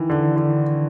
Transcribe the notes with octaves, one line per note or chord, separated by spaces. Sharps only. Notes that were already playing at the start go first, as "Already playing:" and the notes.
Already playing: D#3 E3
D3
D3